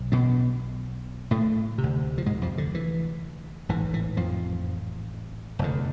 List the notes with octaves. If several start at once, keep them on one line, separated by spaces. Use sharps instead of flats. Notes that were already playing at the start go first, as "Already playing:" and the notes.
Already playing: B1
B2 B3
A2 A3
C3
D2
F3
G#2 G#3
F2 F3
D3
E3
A1 G#2 E3
E3
F2 F3
F1 E2 D3